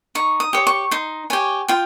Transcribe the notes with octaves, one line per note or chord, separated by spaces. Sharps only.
D#4 C#6
D#6
G4 C#5
C#6
D#4 C6
G4 C#5 G#5
F4 G5